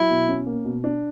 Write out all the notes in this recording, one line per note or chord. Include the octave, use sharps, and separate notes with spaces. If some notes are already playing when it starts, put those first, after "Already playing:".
Already playing: F#3 E4
B2
C#4
A#3
B2
D4